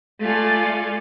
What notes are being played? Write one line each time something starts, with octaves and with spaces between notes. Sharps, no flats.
A3 F4 A4 D5 F5 G#5